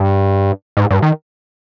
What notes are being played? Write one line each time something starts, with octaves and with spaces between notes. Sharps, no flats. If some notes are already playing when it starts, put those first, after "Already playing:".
Already playing: G2
G#2
G2
D#3